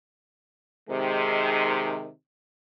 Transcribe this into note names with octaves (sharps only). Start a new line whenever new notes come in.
C3 D#3 G#3